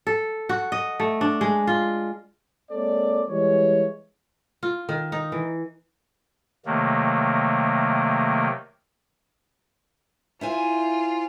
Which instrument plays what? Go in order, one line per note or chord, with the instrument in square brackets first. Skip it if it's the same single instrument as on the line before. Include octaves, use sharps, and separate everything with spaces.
[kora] A4
F#4
D#5
A3
D4
G#3
F4
[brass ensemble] G#3 A#3 C4 A4 C#5 D5
E3 G3 G#3 C#5
[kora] F4
D#3
D#4
E3
[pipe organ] C3 D#3 F#3 A3 A#3
[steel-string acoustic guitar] E4 C5 G#5 [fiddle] F4